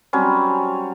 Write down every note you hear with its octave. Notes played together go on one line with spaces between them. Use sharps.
F#3 G3 C4 C#4